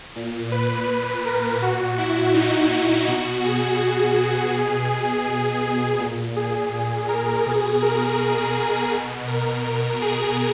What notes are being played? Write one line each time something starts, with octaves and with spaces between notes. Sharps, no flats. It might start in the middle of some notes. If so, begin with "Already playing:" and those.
A#2
B4
B4
A#4
A#2 F#4
E4
D#4
B2 F#4
G#4
B2 G#4
G#4
G#4
A#2
G#4
A#4
B2 G#4
A#4
B2
A#4
G#4